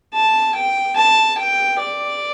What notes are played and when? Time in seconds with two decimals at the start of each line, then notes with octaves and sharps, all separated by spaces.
0.14 A5
0.55 G5
0.96 A5
1.38 G5
1.79 D5